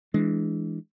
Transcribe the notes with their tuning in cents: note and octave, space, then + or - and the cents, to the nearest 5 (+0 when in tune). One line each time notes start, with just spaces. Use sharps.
E3 +0 G#3 +10 D4 +0